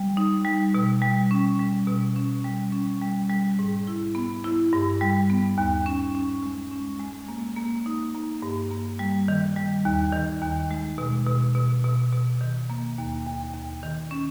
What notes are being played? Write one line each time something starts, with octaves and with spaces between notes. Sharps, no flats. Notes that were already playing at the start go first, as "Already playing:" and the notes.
Already playing: G3
D#4
G3
B2
G3
C#4
G3
B2
C#4
G3
C#4
G3
G3
G#2
E4
B3
E4
G2
G3
B3
D#2
C#4
C#4
G#3
C#4
G#3
A#3
A#3
D#4
A#3
G2
A#3
G3
D#3
G3
D#2
D#3
D#2
G#3
B2
B2
B2
B2
B2
D#3
A#3
D#2
D#2
D#2
D#3
C#4